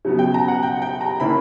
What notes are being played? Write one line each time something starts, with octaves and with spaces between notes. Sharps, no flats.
C#3 F#3 B3
G5
A#5
F#5
G5
G5
A#5
D3 A#3 C#4 E4 B5